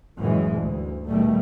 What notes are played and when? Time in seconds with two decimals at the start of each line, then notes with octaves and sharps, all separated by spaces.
0.18 F#2 A2 C#3 E3 G#3
0.55 D2 G2
1.06 B2 D#3 G3 A3